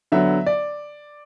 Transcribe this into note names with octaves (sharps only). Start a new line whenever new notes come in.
D3 F#3 B3 E5
D5